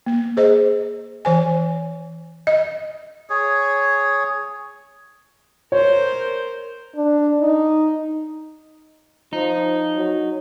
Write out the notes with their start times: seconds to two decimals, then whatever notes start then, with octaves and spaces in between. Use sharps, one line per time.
0.06 A#3
0.37 G#4 C5 D#5
1.25 E3 C5 G#5
2.47 D#5
3.30 G#4 C#5
5.72 A#4 C5 C#5
6.96 D4
7.41 D#4
9.33 F3 D#4
9.96 F#3